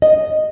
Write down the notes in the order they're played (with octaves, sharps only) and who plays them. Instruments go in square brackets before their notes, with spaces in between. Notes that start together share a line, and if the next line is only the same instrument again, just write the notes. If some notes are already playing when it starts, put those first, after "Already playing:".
[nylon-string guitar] D#5